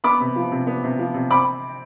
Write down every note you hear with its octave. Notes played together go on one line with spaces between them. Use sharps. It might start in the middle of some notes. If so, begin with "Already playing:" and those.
B3 B5 D6
C3
F3
C3
B3
C3
F3
C3
C4 B5 D6